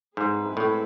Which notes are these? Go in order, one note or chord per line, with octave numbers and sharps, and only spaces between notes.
G#2 G#3 C4 E4 G#4 B4
A2